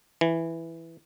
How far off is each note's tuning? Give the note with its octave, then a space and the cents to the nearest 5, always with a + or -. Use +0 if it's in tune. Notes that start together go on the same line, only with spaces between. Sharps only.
E3 +0